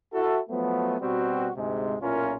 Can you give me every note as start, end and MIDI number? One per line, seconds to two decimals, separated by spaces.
0.13 0.39 64
0.13 0.39 66
0.13 0.39 69
0.50 0.96 53
0.50 0.96 54
0.50 0.96 57
0.50 0.96 59
1.01 1.49 47
1.01 1.49 55
1.01 1.49 60
1.01 1.49 66
1.56 1.95 38
1.56 1.95 44
1.56 1.95 48
1.56 1.95 56
2.01 2.35 35
2.01 2.35 46
2.01 2.35 61
2.01 2.35 64
2.01 2.35 65
2.01 2.35 70